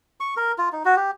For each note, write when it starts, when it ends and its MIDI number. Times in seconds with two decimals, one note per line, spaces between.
0.20 0.34 85
0.37 0.52 70
0.58 0.69 65
0.72 0.83 63
0.85 0.96 66
0.97 1.11 67